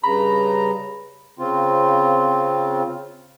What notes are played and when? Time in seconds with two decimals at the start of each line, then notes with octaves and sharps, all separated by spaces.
0.03 G2 C#3 A#5 B5
1.39 C#3 C4 F4